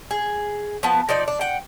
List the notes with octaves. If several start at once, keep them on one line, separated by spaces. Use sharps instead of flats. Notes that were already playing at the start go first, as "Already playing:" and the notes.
G#4
F3 B3 A5
F3 D#4 D5
D4
F#5 G5